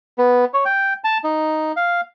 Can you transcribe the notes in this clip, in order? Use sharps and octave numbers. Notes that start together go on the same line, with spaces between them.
B3
C#5
G5
A5
D#4
F5